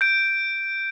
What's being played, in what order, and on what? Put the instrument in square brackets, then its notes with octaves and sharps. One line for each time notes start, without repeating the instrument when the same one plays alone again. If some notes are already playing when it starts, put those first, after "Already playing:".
[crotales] G6 D7